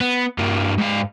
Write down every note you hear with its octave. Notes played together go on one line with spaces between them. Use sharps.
B3
G2 A#3
G#2 F5